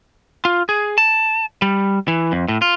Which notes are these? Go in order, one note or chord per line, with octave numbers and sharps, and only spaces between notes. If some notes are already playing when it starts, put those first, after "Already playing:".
F4
G#4
A5
G3
E3
F2
A2
F4